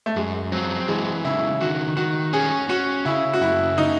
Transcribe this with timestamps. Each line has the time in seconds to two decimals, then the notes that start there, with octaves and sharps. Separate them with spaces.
0.06 A3
0.16 F#2 G#3
0.52 F#3 C4
0.88 E3 G#3
1.24 C#3 E4
1.61 D#3 F#4
1.97 D#3 F#4
2.33 C#4 G#4
2.69 C#4 F#4
3.05 C#3 E4
3.33 F#4
3.41 F#2 E4
3.77 C#3 D#4